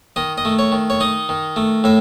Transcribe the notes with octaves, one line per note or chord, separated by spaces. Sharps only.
D#3 D#5
D#5
A3
C#5
D#3
C#5
D#4 D#5
D#3
A3
A2 E5